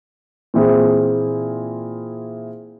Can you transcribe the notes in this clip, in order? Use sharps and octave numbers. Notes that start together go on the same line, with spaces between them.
A#2 E3 C4 E4 G#4